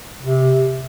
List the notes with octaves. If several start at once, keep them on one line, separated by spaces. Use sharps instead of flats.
C3